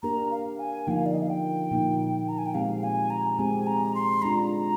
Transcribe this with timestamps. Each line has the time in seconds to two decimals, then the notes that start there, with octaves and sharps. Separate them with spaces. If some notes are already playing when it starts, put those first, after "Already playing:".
0.03 A#3 D4 G4 A#4 A#5
0.31 F5
0.59 G#5
0.87 D3 F3 A#3 D#4 F5 G5
1.06 D5
1.13 D#5
1.22 F5
1.30 G5
1.71 A#2 F3 A#3 D#4
2.28 A#5
2.38 G#5
2.46 G5
2.54 A#2 G#3 C4 G4 F5
2.83 G#5
3.10 A#5
3.39 G#3 C4 G4 G#5
3.67 A#5
3.95 C6
4.22 G#3 D4 F4 A#5